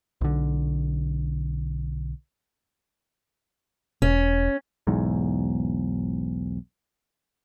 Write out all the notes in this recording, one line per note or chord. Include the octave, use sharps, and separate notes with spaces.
B1 D3
E1 C#4
B1 E2 G#2